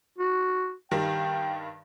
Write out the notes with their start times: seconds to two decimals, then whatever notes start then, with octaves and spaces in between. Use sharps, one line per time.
0.18 F#4
0.91 G2 D#3 G3 G5